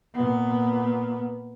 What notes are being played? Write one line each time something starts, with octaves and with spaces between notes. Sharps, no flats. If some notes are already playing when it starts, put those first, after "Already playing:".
A#2 B3